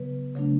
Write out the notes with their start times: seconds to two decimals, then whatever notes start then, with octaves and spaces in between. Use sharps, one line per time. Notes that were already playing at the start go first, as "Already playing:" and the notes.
Already playing: C#3 F#3 B3 B4
0.35 C#3 F#3 A3 D4